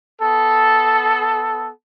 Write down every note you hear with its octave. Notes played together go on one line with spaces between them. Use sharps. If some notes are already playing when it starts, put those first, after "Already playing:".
B3 A4